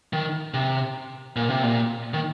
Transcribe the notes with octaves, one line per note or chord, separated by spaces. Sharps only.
D#3
C3
A#2
C3
A#2
D#3